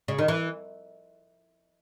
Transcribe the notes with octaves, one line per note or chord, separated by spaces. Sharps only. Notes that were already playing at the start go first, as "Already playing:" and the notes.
C#3
D#3
E3